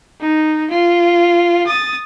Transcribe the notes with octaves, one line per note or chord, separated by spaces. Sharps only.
D#4
F4
D#6 A6